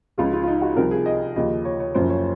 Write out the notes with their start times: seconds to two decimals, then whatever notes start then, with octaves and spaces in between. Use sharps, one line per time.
0.18 C#2 C#3 F3 F4
0.33 F4
0.43 F4
0.47 D#4
0.62 F#4
0.76 C2 C3 F3 A#4
0.91 G#4
1.06 D#5
1.36 D#2 C#3 F3 D#5
1.65 C#5
1.80 C#5
1.95 F#1 F#2 F3 C5
2.09 C#5